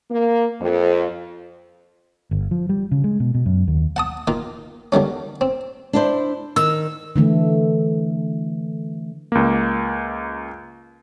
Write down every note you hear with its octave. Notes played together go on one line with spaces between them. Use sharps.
A#3
F2
G1
F3
G3
C#3
G#3
B2
B2
F#2
D#2
F#5 A5 D#6
D#3 A#3 F4
D3 D#3 G3 C#4
C4
D4 E4 C5
D#3 E6
D3 E3 A3
C#2 A#3